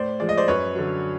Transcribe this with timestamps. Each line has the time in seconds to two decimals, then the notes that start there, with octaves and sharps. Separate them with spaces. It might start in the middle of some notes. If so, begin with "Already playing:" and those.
Already playing: A2 C5 D5
0.20 F3 G#3 D5
0.29 D#5
0.37 C5 D5
0.48 F#2 B4 C#5
0.75 D3 F#3